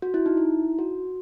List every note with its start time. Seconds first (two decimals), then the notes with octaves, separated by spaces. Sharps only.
0.02 F#4
0.14 E4
0.26 D#4
0.37 E4
0.79 F#4